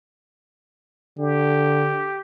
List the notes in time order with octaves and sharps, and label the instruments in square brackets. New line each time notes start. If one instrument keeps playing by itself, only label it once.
[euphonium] D3 [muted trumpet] G4